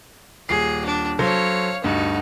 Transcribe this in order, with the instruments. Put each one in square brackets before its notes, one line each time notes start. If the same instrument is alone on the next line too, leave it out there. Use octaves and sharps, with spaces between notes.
[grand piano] D#1 C7 [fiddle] G#4
[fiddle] D4
[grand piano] F#3 A4 C5 [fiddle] C#5 F5
[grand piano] D2 G2 [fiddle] D#4 F#4